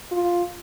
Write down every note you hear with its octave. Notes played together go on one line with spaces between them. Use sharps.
F4